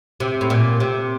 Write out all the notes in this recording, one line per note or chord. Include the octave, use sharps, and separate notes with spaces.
C3
A2
A#2
C3